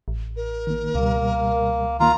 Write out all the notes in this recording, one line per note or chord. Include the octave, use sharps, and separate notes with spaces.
A1
A#4
D#3 A#3
C#2 B2 G3 A#3
D#3 A#3 F4 A#5